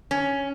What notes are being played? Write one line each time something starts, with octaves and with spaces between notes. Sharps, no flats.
C#4